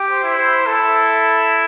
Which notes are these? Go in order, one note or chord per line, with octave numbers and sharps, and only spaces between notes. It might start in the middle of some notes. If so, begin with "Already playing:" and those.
Already playing: G4
C5
E4
C5
E4 A4